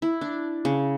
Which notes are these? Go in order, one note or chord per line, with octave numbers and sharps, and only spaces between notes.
E4
D4
C#3